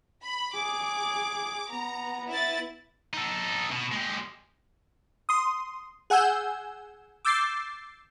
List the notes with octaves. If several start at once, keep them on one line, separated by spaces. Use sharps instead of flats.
B5
G#4 D6
B3 A#5
E4 B4 A6
D#4 A4
B2
G#3 G4
C6 D#6
G#4 F#5 G#5 E6 G6
D6 E6 G6 A6 C7